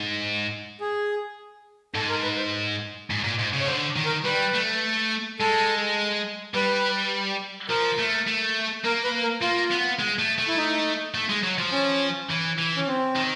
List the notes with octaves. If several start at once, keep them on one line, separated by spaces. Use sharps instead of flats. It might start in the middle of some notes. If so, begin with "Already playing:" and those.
Already playing: G#2
G#4
G#2 A4
A#4
B4
C5
G#2
A#2
G#2
C#3
C#5
D3 C5
D#3
A#4
G3 B4
A3
G#3 A4
G3 B4
F3 A#4
A3
A3
A#3 A#4
B4
A#4
A#3 F4
B3
G#3
A3
A3
E4
D#4
A3
G#3
F#3
F3
C#4
E3
E3
C#4
C4
D#3